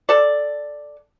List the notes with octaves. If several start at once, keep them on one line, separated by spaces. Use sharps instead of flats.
A4 D5